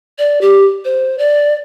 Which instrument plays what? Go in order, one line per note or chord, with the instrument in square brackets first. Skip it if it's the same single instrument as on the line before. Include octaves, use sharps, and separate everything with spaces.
[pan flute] D5
G4
C5
D5